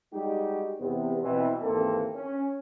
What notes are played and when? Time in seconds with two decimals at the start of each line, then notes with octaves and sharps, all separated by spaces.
0.13 G3 G#3 D#4 F#4 G4
0.80 E2 C3 B3
1.22 B2 E3 C4
1.61 G#1 D#2 E3 A#3 C4 A4
2.15 C#4